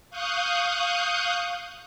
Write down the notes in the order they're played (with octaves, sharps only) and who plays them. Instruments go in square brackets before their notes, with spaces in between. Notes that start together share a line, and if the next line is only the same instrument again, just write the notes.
[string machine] F5 C#6 D#6 F#6 G6